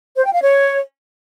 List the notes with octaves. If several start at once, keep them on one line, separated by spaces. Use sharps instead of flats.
C5
G5
F5
C#5